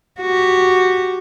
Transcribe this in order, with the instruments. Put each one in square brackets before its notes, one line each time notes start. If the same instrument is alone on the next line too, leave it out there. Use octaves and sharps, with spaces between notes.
[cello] F#4 G4